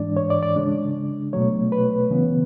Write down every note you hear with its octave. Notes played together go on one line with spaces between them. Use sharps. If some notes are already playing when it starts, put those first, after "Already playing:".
Already playing: G#2 E3 G#3 D4 D5
C#5
D5
D5
C#3 G#3 D4
B2 F#3 A3 C#5
B4
C#3 E3 B3